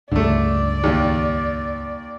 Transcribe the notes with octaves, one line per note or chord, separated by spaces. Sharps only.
C#2 G2 D3 A3 D5
D#2